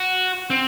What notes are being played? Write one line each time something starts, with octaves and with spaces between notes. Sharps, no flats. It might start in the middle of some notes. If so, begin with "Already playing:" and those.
Already playing: F#4
C4